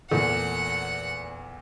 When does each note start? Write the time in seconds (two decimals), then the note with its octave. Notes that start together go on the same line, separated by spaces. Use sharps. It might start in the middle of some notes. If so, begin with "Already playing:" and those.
0.11 E2 A#2 A3 F#5